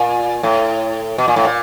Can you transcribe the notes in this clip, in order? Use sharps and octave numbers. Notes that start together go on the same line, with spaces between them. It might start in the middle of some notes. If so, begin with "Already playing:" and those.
Already playing: A#2
A2
B2
A#2
A2
A#2